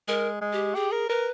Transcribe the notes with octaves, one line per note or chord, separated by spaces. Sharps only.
G#3 A#4
G#3
G4
G4 G#4
A#4
A#4 B4